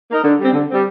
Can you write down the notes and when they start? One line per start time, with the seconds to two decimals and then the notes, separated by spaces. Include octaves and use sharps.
0.09 A#3 D#4 A#4 D#5
0.23 D3
0.39 G3 C4
0.53 D3
0.68 G3 C4